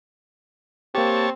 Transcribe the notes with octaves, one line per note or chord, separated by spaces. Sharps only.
A#3 C4 G4 C#5 A5